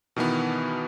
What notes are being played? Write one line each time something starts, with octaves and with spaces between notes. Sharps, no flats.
B2 D#3 E3 B3